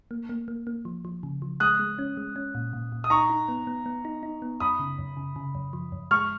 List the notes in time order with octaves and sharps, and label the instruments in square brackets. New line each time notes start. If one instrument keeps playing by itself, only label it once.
[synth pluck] A#3
A#3
A#3
A#3
F3
F3
C#3
F3
[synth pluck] G#3 [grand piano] D#6 F#6
[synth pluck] G#3
C#4
G#3
C#4
A#2
A#2
A#2
[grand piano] D#6
[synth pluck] D#4 [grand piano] A#5 C#6
[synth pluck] D#4
B3
B3
B3
D#4
D#4
B3
[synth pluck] F#2 [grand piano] B5 D#6
[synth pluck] C#3
F#2
C#3
C#3
F#2
F3
F#2
[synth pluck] G#3 [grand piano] C#6 F6